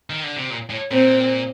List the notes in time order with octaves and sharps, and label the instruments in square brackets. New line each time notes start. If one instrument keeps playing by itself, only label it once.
[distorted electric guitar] D#3
D3
C3
A#2
A2
[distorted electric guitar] A#2 [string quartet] C4